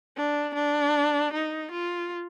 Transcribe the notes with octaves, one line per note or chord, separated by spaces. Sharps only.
D4
D4
D#4
F4